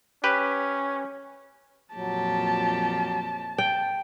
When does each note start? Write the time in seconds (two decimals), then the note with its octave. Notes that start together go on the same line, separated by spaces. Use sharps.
0.24 C#4 G4 B4
1.95 F2 A#2 F#3 G4 A5
3.58 G5